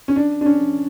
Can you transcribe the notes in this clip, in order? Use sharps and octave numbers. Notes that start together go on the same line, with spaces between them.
C#4
D4
D4
C#4